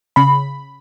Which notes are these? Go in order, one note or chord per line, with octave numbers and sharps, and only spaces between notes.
C#3 B5